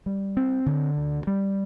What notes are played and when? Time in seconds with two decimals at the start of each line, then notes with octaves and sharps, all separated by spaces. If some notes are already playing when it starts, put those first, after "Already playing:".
0.06 G3
0.37 C4
0.66 D3
0.98 D2
1.27 G3